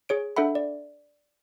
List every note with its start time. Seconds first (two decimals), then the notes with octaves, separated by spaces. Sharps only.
0.09 G#4 C#5 D7
0.36 D4 A4 E5 F#5 B5
0.55 D5